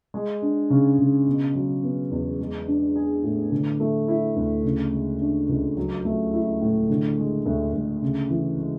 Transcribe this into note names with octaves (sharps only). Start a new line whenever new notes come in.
G#3
D4
C#3
C#3
B2
F#3
B3
E2
G#3
D4
G#4
A2
D3
A3
E4
D2
C#3
G#3
D4
C#2
F#3
A3
E4
A2
D3
G#3
D2
D2
C#3
E3
G#3